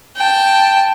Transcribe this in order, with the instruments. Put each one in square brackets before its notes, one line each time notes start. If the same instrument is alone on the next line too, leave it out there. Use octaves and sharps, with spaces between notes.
[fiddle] G5 A5